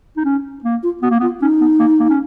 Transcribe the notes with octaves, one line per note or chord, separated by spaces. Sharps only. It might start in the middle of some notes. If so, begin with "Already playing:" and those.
D#4
C#4
A#3
F4
B3 F#4
A#3
B3 F4
C#4 D#4
B3
A#3
A#3
C#4